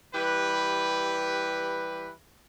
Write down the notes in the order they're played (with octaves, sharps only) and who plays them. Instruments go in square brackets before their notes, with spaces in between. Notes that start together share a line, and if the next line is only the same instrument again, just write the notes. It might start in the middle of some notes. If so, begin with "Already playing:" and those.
[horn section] E3 G3 G4 B4